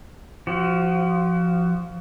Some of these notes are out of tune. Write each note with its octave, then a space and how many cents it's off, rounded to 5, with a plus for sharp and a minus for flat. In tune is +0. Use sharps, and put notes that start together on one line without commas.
F3 +0 F#4 +25